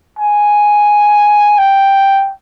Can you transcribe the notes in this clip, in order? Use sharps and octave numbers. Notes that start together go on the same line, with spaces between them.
G#5
G5